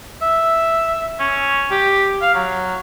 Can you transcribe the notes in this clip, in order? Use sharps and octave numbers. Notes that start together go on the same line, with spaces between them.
E5
C#4
G4
F5
F#3